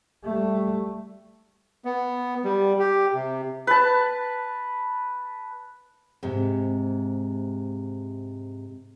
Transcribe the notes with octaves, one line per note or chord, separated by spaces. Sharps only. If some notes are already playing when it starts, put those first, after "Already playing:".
G3 A3
B3
G3
G4
C3
B4 A5
G#2 C3